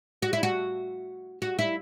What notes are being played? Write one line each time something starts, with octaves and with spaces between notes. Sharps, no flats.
F#4
E4
F#4
F#4
E4